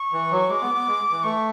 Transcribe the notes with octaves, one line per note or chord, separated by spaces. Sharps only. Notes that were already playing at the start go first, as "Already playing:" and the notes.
Already playing: C#6
E3
F#3
G#3 D6
B3
B3
G#3
E3
A3 C#6